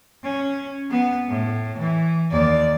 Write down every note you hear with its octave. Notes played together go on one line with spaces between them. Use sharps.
C#4
B3
A2
E3
D#2 D5